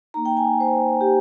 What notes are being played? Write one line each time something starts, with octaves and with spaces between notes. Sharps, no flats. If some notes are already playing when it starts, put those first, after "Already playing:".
A#3 D#4 A#5
G5
G#5
C5
G4